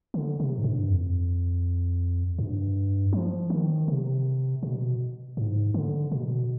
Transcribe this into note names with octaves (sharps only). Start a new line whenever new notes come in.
D3
C3
G#2
G2
F2
G2
F3
D#3
C3
B2
G#2
D3
B2